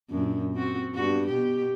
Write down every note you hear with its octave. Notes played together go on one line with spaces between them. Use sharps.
F#2 A#2 D4
C4 F#4
G2 B3 F#4
B2 G4